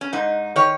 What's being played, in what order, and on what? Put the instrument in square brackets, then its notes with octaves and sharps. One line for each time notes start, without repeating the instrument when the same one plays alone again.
[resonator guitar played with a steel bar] C#4
G#2 D#4
D#3 C#5